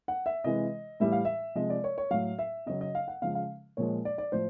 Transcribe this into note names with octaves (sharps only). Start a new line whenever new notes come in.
F#5
E5
C3 E3 G#3 D#5
A2 E3 G3 E5
F5
E5
C3 F3 G#3 D#5
D5
C#5
C#5
A2 F#3 F5
E5
C#3 F#3 D#5
D#5
F5
F#5
C#3 F3 G#3 F5
F5
A#2 F3 G#3 C#5
D5
D5
A2 F3 C5